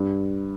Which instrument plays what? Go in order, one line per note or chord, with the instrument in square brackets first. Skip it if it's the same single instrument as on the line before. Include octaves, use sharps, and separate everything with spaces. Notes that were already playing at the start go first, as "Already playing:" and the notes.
Already playing: [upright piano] G2